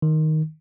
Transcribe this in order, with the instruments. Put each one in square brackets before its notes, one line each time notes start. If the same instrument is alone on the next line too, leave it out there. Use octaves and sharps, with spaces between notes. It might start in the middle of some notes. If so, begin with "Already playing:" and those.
[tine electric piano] D#3